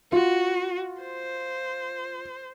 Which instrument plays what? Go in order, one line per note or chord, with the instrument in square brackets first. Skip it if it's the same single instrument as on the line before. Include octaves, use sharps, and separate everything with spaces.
[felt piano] F4 [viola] F#4
[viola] C5